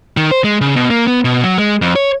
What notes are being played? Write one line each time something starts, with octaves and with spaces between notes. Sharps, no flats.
D#3
C5
G#3
C#3
B2
A#3
B3
B2
F#3
G#3
F2
C#5